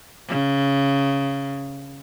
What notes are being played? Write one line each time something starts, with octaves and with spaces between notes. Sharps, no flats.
C#3